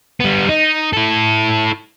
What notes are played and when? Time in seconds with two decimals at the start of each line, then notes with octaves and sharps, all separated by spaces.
0.21 G3 B3
0.48 D#4
0.93 E4 A4